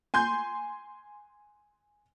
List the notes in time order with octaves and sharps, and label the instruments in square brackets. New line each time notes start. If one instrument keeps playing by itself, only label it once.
[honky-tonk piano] G#5 C6 G6